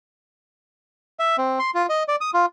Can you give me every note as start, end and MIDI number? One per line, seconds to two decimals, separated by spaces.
1.19 1.36 76
1.38 1.59 60
1.59 1.71 84
1.75 1.86 65
1.89 2.03 75
2.08 2.16 74
2.21 2.31 87
2.34 2.46 65